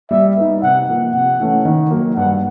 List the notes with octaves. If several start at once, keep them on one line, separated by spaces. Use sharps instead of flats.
G3 E5
B3 D#4
C3 F#5
F3 A#3
C3 F#5
E3 A3 C#4
D#3
F#3 A#3
G2 F#5